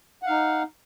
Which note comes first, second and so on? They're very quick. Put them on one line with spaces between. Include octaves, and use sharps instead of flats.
F#5 F5 D#4